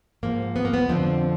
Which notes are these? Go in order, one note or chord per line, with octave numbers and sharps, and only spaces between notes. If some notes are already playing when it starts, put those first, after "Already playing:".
G#2 F3 A#3
B3
A#3
B3
F2 D3 F3 C4